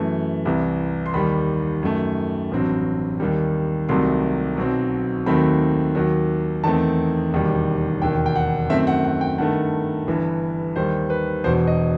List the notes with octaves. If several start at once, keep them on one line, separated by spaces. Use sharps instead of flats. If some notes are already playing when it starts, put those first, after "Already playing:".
Already playing: F#2 E3 A3
C2 C3 E3
C6
D#2 D#3 G3 B5
F#2 D#3 A3
A1 G2 F#3 C4
D#2 D#3 G3
C2 C3 D#3 F#3 A3 C6
B1 B2 F#3 C4
D#2 D#3 F#3 A3 C4 B5
D#2 D#3 F#3
E2 D#3 A3 C4 A5
E1 D#2 D#3 G3
E1 D#2 D#3 G5
G5
F#5
F#2 D#3 A3 C4 E5
F#5
F#5
G5
G2 D#3 A3 F#5
G1 G2 E3
D#2 D#3 G3 C5
B4
E1 E2 B2 C5
D#5